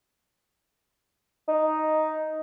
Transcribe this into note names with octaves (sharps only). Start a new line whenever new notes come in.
D#4